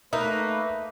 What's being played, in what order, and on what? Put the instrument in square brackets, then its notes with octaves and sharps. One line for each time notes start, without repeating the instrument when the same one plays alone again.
[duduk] A3 [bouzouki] A#3 D#4 [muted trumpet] B4 [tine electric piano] E5